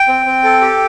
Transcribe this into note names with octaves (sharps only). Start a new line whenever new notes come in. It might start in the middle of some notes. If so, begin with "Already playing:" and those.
Already playing: G5
C4
C4
A4
G4